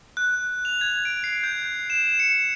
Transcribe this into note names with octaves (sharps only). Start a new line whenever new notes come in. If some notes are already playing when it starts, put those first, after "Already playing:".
F#6
F7
G#6
D7
C7
G6
E7
C#7